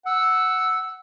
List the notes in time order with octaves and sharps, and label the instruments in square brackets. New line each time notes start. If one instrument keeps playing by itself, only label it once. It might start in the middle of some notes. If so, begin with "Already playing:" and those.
[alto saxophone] F#5 [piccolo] E6